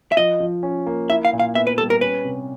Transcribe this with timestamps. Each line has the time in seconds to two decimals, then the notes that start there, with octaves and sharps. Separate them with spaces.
0.12 E5
0.17 F3 D#5
0.40 F3
0.63 C#4
0.87 A#3
1.10 E4 E5
1.25 F5
1.33 A#2
1.40 F5
1.55 B3 E5
1.67 B4
1.78 G3 A4
1.90 A#4
2.01 C#4 B4
2.25 C3